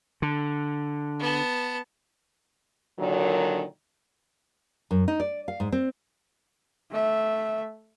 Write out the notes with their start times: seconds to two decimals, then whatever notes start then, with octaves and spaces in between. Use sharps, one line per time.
0.22 D3
1.19 B3 A5
2.99 A#2 D3 D#3 F#3
4.91 F#2
5.08 D#4
5.20 D5
5.48 F5
5.60 G#2
5.72 C4
6.91 A3 E5